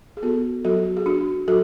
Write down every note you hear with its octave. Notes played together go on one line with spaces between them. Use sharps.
G#4
B3 F#4 A4
F#3 F#4 A4
G#4
D4 F#4
F#3 F#4 A4